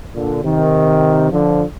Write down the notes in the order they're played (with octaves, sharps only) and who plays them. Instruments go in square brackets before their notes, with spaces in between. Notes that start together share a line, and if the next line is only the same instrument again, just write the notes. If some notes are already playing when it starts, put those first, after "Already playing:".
[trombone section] A#2 D3
C3 D#3
D3 F3